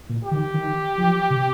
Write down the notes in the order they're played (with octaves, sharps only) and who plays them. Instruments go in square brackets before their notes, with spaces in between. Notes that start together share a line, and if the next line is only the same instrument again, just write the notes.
[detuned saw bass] A#2
[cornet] G4
[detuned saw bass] D#3
D#3
F3
C3